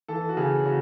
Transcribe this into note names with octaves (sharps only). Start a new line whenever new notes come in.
E3 A4
F#4
C#3 G#4
C#3 F#4